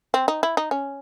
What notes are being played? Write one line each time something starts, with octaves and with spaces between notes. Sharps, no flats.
C4
D#4
E4
D#4
C#4